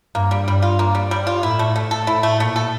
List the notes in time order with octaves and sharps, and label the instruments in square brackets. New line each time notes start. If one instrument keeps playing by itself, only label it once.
[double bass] G2 [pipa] A#3
[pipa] G3
[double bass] G2 [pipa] G3
[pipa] F4
A#3
G3
G3
F4
[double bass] A2 [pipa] E4
[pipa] A3
[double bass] A2 [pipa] A3
[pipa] A4
[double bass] A2 [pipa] E4
[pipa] A3
[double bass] A#2 [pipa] A3
[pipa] A4